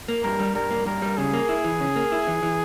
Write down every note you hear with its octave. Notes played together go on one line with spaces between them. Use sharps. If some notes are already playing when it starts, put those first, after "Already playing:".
A#3
G2 A#4
G3
G2 A#4
A#3
G2 A#4
G3
C#3 G#4
A#3
E4
E3
C#3
A#3
E4
E3
E3